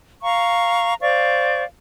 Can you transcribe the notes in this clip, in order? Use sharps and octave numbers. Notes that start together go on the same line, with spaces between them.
F5 A#5 C#6
C5 D5 F5 C#6